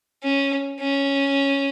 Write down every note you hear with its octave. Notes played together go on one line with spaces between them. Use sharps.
C#4
C#4